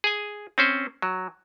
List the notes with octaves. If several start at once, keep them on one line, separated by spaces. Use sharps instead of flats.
G#4 G#5
C4 C#4 C5
F#3